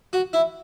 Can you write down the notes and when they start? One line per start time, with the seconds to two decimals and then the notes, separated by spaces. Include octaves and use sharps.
0.13 F#4
0.33 E4